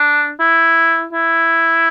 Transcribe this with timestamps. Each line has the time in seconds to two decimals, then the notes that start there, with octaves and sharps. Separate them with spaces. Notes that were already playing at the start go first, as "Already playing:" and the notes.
Already playing: D4
0.40 E4
1.13 E4